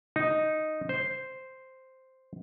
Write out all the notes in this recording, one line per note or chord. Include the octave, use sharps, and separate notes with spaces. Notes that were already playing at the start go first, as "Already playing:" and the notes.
D#4
C5